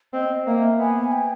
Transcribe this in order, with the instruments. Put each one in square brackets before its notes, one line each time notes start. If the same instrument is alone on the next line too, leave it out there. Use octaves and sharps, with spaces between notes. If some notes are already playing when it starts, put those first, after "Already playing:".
[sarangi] C4 [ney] D#5
[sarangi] A#3 [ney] E5
[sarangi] B3 [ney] G#5
[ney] G5